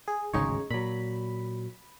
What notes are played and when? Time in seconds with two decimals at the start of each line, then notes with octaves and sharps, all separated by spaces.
0.08 G#4
0.34 D1 G#1 C#3 G#3 D#4 C#5
0.71 A#2 F#3 B5